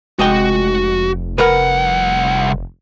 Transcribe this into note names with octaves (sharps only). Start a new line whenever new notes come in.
F1 G#3 F#4 D#5 G5
C2 A#4 B4 F#5